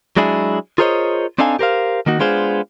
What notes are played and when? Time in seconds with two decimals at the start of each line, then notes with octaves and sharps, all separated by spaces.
0.17 F#3 G#3 D4 E4 G#4
0.78 F4 G#4 A#4 C5 C#5 D#5
1.38 C4 D4 D#4 A4 F5 G#5
1.59 G4 A#4 C5 F5
2.06 D#3 A#3 D#4 F#4
2.19 G#3 B3 D4 F4 G#4 C5